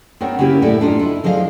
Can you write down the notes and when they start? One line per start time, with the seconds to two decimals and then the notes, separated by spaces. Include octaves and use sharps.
0.21 B3 C4 D#4 A#4 C#5
0.39 C#3 A#3 E4 G4 B4
0.62 A2 E4 A4 D5
0.81 D4 D#4 F4
0.99 E4
1.24 D3 F3 G#4 D#5 F5